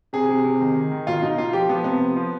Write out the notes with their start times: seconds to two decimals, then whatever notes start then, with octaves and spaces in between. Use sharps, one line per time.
0.13 C3 G#4
0.29 C3
0.44 C3
0.60 D#3
0.75 D#3
0.91 D#3
1.07 B2 F4
1.22 B2 D#4
1.37 B2 F4
1.53 F3 G4
1.69 F3 B3
1.84 C3 B3
2.00 F3
2.16 F3